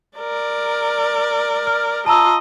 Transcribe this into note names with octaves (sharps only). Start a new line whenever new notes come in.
A#4 D5
F6
F4 D#5 A5 A#5 E6